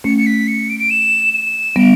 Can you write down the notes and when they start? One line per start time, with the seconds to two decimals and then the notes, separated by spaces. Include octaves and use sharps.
0.04 A3 C#4 C#7
0.18 C#7
0.26 B6
0.47 C#7
0.69 D7
0.80 D7
0.90 E7
1.34 E7
1.76 G3 B3 D7